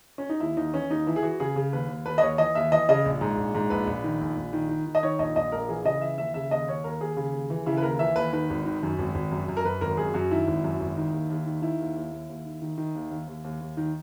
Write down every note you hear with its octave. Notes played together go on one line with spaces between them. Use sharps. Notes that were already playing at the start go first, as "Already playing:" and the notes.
C#4
D#4
D#2 E4
D#2 D#4
E3 C#4
D#2 D#4
E3 E4
G#4
E3 F#4
C#3 G#4
C#3
D#2 B4
D#2
D#2 B4
D#5
D#2 C#5
E3 D#5
D#2 E5
E3 D#5
C#3 D#5
A#1
G#2
A#1
G#2
A#1 B4
A#1
D#3
A#1
A#1
D#3
D#3
D#3
D#5
D#3 C#5
A#1 D#5
A#1 D#5
A#1 A#4
E3 G#4
C#3 D#5
E3 E5
D#2 E5
C#3 E5
D#2 D#5
D#2 C#5
D#2 A#4
D#2 G#4
C#3
D#2
E3
C#3 E4
B4
D#2 A#4
E3 E5
D#2 B4
D#3 B4
G#1
D#3
F#2
G#1
G#1
F#2
F#2
A#4
F#2 B4
G#1 A#4
F#2 G#4
F#2 F#4
D#3 E4
G#1
F#2
G#1
D#3
D#2
D#2
D#3
D#3 E4
D#2
D#2
D#2
D#2
D#3
D#3
D#3
D#2
D#2
D#2
D#2
D#2
D#3